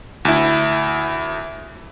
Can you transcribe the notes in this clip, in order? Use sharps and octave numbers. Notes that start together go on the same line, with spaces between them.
D2 E4